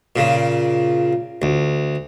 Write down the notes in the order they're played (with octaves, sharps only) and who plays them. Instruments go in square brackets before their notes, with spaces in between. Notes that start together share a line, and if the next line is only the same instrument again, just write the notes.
[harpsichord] A#2 C#3
D2